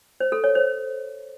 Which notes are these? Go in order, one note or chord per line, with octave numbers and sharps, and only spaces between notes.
C5
A4
C#5
C5